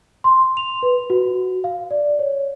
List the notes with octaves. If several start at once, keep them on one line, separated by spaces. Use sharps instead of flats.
C6
F7
B4
F#4
F5
D5
C#5